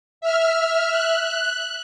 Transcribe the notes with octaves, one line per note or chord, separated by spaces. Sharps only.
E5 F6
F#6